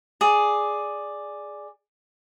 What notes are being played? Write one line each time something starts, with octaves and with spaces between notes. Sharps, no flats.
G#4 D5